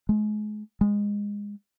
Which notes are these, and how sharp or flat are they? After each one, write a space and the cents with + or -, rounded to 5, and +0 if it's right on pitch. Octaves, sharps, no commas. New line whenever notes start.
G#3 +35
G#3 -20